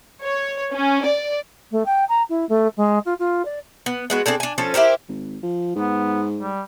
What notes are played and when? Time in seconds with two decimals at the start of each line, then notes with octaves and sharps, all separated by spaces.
0.24 C#5
0.73 C#4
1.04 D5
1.71 A3
1.86 G5
2.09 A#5
2.29 E4
2.49 A3
2.77 G#3
3.05 F4
3.19 F4
3.45 D5
3.86 B3
4.10 G#3 B3 F#4
4.26 C4 D4 G#4 A4
4.40 D4 G#5
4.58 F3 C#4 A4
4.74 E4 G4 A#4 C5
5.09 G#1
5.43 F3
5.76 G#2 B3
6.39 G3